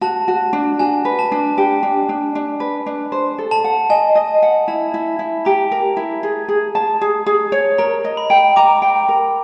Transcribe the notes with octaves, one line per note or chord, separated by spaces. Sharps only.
F#4 A5
F#4
D4
F#4 G#5
B4
A5
D4
G4
D4
D4
D4
B4
D4
C5
A4
A5
F#5
D#5 G#5
D#5
F#5
E4 A5
E4
E4
G4 A#5
A#4
E4
G#4
G#4
A5
G#4
G#4
C#5
A#4 A#5
D#5
B5
G5
A#5 D6
G5
A#4